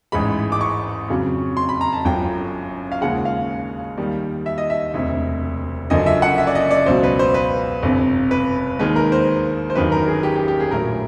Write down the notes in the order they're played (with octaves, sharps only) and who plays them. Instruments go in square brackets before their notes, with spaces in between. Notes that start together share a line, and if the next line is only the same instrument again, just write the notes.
[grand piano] A1 G#2 E3 G#3 B5
D6
C#6
F2 C#3 F#3
C6
B5
A#5
A5
G1 F#2 D3 F3 G5
F5
D#2 C#3 F3 G#3 F#5
F5
D#2 D#3 G3
E5
D#5
E5
E1 D2 C3
F#1 F#2 D3 F3 D#5
E5
F#5
E5
D5
D#5
D5
C#2 B2 F#3 C5
B4
C5
B4
G1 F2 C3
B4
D#2 D#3 G#3 B4
A#4
C5
C5
G1 F#2 D#3 F#3 B4
A#4
G#4
G4
G4
G4
G#4
A#1 A2 F#3 A#4